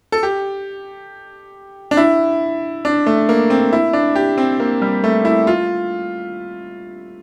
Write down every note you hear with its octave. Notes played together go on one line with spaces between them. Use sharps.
A4
G4
D4
E4
D4
A3
A#3
C4
E4
D4
G4
C4
A#3
G3
A3
E4
F4